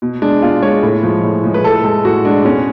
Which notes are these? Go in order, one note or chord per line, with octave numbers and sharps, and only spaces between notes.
B2
G#3 D4
B2 F4
G#3 C#5
A2
F3 G#3
A2
F3 G#3
B4
A2 A4
G#3 A4
A2 F#4
G#3 D4
B2 C#4